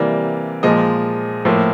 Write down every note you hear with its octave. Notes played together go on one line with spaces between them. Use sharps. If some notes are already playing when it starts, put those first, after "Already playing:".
Already playing: C3 E3 G3 A#3 D5
A#2 F3 G#3 D#5
A2 F3 A#3